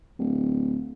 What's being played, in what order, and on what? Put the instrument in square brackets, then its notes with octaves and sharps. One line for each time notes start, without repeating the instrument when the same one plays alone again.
[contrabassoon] D1